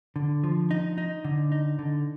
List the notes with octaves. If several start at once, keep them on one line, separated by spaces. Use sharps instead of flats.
D3
F3
D#4
D#4
D3
D#4
D3